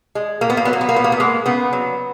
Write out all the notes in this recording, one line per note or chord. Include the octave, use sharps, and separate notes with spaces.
G#3
A#2 A#3
B3
A#3
F#3 B3
A#3
B3
A#3
A#2 B3
A#3
B3
G#3 A#3
C#3 B3
F#3